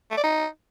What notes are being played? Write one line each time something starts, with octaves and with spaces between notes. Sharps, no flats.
A3
D5
D#4